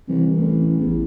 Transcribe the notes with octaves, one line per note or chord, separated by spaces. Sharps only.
C2 E3
A1
A1 E2